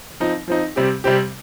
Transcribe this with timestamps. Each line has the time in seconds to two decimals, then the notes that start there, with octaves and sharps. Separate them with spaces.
0.20 F3 C4 D#4
0.48 F3 C4 D#4
0.76 C3 G3 C4 G4
1.04 C3 G3 C4 G4